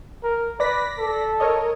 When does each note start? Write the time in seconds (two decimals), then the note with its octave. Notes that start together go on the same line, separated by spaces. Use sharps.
0.24 A#4
0.60 B4 D5 A#6 B6
0.98 A4
1.40 A#4 C#5 D#5